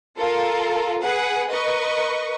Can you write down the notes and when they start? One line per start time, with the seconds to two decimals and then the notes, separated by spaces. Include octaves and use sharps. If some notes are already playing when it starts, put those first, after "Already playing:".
0.18 F4 A4 A#4
1.03 G#4 B4 F#5
1.52 A#4 B4 D#5 C#6